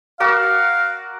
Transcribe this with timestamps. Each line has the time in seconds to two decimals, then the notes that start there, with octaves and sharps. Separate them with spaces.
0.20 F#4 A#4 D5 F5